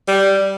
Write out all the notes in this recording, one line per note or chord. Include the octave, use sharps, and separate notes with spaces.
G3